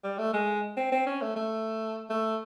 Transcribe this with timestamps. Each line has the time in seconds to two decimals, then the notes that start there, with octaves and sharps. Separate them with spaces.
0.04 G3
0.19 A3
0.34 G#3
0.77 C4
0.92 C4
1.06 C#4
1.22 A3
1.36 A3
2.10 A3